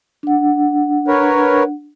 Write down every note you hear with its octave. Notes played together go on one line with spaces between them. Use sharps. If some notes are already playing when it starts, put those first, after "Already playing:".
D4 F#5
A#4 B4 C#5